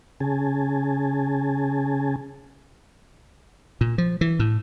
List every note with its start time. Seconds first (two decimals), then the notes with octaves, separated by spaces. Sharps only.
0.20 C#3 C#4 G#4 G#5 A5
3.81 A#2
3.98 F3
4.21 E3
4.39 A2